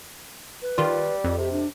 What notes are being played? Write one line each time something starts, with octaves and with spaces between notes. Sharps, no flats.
B4
D#3 G3 F4
F2
C3 G4
D4